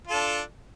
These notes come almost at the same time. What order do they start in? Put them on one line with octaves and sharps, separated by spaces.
F4 A4 D4